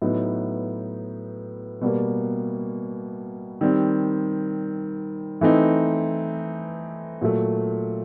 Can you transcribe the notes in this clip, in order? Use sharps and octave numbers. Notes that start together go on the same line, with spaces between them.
A2 F#3 B3 D#4
B2 G3 A#3
D#3 G3 C4
E3 A3 C4 D#4
A#2 F#3 A3